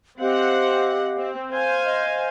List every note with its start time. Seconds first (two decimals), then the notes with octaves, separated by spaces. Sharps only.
0.20 C4 G4 D#5 F5 F#5
1.18 C4
1.52 C5 F5 G#5
1.84 D#5